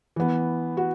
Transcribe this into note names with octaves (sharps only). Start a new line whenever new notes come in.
E3 B3
F#4